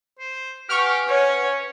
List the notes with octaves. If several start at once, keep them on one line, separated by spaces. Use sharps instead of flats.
C5
G4 B4 F#5 G#5 C#6 F6
C#4 C#5